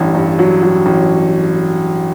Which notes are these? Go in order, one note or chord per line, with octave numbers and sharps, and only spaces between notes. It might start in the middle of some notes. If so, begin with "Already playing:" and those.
Already playing: A1 G2
G2
F#3
F#3
A1